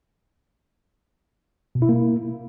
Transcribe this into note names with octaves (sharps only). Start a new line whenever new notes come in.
B2
E4
A#3